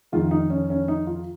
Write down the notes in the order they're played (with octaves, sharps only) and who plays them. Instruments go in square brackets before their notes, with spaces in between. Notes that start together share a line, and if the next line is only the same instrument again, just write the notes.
[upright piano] F2 D#3 G#3 F4
D#4
C#4
C#4
D#4
F4